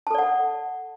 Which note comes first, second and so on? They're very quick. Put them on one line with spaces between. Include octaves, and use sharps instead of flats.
A5 A4 D5 F#5